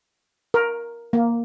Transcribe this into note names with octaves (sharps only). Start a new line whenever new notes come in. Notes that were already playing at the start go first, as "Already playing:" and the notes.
A#4
A#3